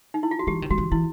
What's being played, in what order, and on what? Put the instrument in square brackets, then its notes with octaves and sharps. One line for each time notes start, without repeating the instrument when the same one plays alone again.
[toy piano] D#4
E4
F4
F#4
[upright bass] E3 [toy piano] G4
[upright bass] D#3
[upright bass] F3 [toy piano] F#4
[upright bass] E3
[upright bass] E3 [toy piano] E4